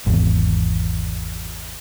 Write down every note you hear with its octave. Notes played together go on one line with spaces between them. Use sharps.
G#1 E2